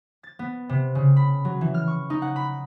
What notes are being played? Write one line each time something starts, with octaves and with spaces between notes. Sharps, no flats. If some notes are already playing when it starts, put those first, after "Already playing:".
A6
B3
C3
C#3
B5
F#3
E3
F6
C#6
D#4
F#5
B5